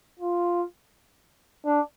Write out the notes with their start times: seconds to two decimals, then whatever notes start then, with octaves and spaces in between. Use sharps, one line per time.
0.19 F4
1.66 D4